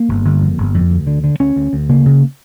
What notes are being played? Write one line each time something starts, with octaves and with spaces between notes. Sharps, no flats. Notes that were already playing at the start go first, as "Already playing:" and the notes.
Already playing: A#3
G1
G1
F2
G1
F2
D2
D3
D3
D2 C#4
D2
D2
C#3 A#3
C#3